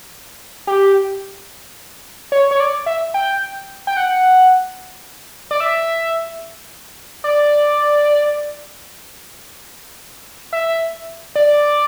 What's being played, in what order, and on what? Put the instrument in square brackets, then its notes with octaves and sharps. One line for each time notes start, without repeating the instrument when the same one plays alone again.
[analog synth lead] G4
C#5
C#5
D5
E5
G5
G5
F#5
D5
E5
D5
E5
D5